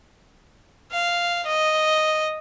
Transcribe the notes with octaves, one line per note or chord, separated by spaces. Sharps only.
F5
D#5